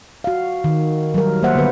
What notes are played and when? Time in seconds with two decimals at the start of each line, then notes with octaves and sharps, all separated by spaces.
0.24 F#4 F5
0.64 D#3
1.14 F#3 G3 A#4
1.42 D#3 A#3 C5 E5 F#5
1.55 D3 B3 B4